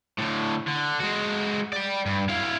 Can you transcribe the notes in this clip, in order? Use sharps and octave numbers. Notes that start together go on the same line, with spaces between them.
A2 D3
D3
G#3 F#4
D5 G5
G2
E4 F5